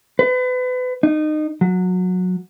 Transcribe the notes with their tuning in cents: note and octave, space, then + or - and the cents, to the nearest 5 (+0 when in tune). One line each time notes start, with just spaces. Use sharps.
B4 +35
D#4 -25
F#3 -20